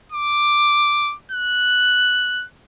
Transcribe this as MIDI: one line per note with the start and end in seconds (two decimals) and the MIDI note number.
0.12 1.15 86
1.32 2.45 90